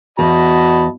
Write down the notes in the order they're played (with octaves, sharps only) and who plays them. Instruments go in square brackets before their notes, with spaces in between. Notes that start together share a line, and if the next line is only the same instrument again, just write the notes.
[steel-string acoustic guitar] E2 [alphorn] F#4 [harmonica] D#5 A5 B5